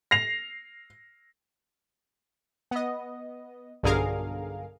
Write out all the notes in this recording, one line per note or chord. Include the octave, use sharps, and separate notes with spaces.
A#6 C7 F7
B3 D#5
B1 G2 D3 G#4 A#4 F5